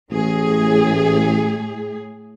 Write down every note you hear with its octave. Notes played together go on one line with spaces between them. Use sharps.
A1 A2 G#4